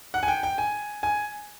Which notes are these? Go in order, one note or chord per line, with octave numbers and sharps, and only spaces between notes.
F#5
G#5
G5
G5
G#5
G#5